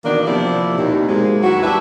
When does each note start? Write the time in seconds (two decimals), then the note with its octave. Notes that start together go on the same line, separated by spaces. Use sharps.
0.05 B2 D#3 E3 A#3 B3 D4
0.26 C3 F3 A#3 E4 D5
0.76 D#2 B2
1.09 G#2 F#3 G#3 A#3 C4
1.42 D#2 F#3 E4 F#4
1.62 G3 D4 E4 B4 E5